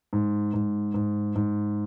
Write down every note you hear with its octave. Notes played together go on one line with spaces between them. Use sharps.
G#2
G#2
G#2
G#2